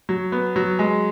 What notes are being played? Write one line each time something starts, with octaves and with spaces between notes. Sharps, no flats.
F#3
B3
F#3
G#3